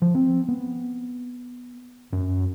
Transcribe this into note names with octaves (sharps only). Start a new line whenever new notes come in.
F3
C4
B3
F#2